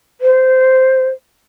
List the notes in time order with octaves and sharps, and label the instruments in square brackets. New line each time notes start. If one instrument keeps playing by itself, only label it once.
[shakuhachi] C5